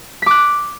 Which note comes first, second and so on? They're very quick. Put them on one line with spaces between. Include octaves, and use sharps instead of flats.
B6 D6 F#6